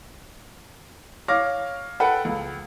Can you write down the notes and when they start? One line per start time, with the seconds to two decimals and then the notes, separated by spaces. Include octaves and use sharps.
1.28 C#5 F5 D6 F6 A#6
2.00 A4 B4 F#5 G5
2.25 C#2